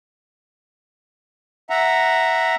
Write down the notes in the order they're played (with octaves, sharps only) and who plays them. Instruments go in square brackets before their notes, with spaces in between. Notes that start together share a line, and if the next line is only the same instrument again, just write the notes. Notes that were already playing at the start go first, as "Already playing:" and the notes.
[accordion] E5 F#5 A#5